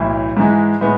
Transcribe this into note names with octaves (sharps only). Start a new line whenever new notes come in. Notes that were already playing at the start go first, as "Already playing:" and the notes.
Already playing: B1 A2 E3
G#2 E3 G#3
A2 G#3 B3